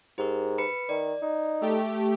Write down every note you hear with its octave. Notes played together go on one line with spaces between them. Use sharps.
G#2 G4 A#4
B4 B5 C#7
D#3 D5
D#4
A3 G4